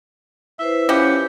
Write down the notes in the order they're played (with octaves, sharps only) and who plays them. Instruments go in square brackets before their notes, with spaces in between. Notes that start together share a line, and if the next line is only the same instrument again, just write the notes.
[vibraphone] E4 B4 C5 [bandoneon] E5
[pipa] E3 F3 G4 [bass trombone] C#4 [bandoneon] F#5